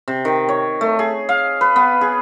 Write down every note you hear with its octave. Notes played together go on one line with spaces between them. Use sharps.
C3
D#3
C#5
A3
G#4
F5
B4
B3
G#4